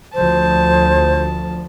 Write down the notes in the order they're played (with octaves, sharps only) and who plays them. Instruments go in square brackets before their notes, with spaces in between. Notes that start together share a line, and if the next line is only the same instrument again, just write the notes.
[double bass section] D2 F3 [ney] C5 [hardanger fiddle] A5